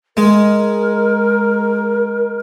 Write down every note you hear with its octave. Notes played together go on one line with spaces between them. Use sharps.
G#3 A#4